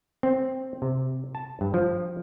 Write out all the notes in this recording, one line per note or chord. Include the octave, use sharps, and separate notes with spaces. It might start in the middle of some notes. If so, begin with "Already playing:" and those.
C4
C3
A5
G2
F3